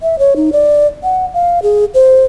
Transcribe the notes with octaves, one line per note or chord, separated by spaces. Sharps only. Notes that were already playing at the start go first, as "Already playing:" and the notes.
E5
C#5
D#4
D5
F#5
F5
G#4
C5